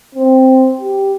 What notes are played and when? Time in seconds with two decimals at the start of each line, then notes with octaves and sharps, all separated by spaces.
0.15 C4
0.81 G4